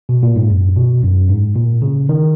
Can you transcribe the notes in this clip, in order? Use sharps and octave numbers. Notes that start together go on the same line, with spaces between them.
B2
A#2
G#2
F#2
B2
F#2
G#2
A#2
C#3
D#3